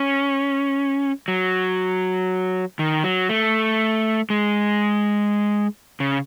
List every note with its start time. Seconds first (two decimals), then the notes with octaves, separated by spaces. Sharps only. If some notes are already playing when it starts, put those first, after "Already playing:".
Already playing: C#4
1.28 F#3
2.79 D#3
3.04 F#3
3.29 A3
4.30 G#3
6.00 C#3